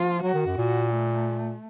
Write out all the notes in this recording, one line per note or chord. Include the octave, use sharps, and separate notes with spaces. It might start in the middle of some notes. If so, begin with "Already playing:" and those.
Already playing: F3 F4
F#3 F#4
D#3
F#2
A#2 F#4
A3